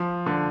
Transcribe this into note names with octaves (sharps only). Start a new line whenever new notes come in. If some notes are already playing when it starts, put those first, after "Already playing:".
Already playing: F3
D3